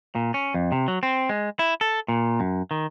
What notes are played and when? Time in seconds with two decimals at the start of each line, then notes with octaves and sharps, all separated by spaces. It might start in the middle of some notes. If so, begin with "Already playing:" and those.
0.15 A#2
0.34 C#4
0.54 F2
0.72 C3
0.88 F#3
1.03 C4
1.29 G#3
1.59 E4
1.81 A4
2.08 A#2
2.40 F#2
2.71 D#3